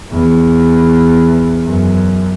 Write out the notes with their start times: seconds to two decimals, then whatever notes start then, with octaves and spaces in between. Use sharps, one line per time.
0.12 E2
1.66 F#2